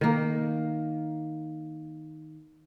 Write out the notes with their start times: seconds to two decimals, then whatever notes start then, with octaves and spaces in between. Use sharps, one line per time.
0.01 D#3 A#3